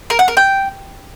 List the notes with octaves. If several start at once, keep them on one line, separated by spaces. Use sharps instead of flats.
A#4
F#5
A#4
G5